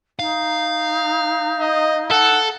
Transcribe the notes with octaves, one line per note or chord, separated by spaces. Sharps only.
D#4 F5
D#5
A4 F#5